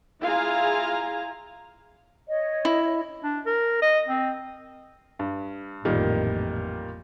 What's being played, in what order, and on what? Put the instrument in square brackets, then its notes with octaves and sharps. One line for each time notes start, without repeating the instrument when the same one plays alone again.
[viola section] E4 F4 G#4 F5 G#5 A#5
[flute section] C#5 D#5
[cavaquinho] E4
[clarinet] D4
A#4
D#5
C4
[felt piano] G2
[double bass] A1 F2 [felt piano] A#2 D#3 G3